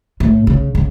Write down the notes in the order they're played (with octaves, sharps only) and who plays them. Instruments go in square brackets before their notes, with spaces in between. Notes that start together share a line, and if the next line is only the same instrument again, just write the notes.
[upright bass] A2
C#3
C#3